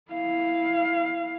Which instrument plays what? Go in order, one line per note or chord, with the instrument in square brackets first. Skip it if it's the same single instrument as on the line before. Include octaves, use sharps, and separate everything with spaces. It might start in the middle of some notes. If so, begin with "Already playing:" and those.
[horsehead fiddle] E4 F5